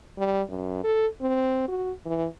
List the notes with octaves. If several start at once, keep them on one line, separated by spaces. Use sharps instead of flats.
G3
F#2
A4
C4
F#4
E3